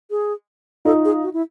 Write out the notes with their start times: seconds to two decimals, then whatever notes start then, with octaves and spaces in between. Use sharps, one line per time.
0.10 G#4
0.85 D#4 F4 A4
1.05 G#4
1.23 F#4
1.33 E4